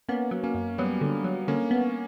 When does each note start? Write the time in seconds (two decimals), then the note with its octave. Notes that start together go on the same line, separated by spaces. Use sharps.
0.08 A#3 B3 C#4
0.31 F#3
0.43 A#3 C#4
0.55 F#2
0.78 F#3 G3 B3
1.01 D3
1.24 F#3
1.48 D3 A#3 C#4
1.71 B3